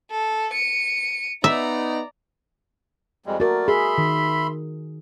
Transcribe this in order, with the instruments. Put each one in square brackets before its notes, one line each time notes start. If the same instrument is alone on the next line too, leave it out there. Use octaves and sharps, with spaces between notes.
[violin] A4
C#7 D#7
[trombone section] B3 D#4 [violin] D5 A#5 [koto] E5
[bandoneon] F2 G3 G#3
[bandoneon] A3 D5 [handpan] F#4 A#4
[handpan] G#4 [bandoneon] E5 B5 C6
[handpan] D#3